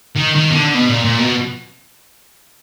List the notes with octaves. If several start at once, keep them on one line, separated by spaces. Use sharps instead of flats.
D#3
D#3
B2
D3
B2
A#2
A#2
B2